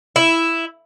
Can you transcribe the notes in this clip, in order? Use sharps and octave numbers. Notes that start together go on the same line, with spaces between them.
E4